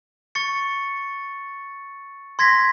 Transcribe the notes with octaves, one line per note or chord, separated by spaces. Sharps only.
C#6 A6 C#7
C6 G#6 A#6 B6